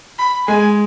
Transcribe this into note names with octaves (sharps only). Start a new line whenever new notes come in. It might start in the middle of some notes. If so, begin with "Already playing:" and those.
B5
G#3 G#5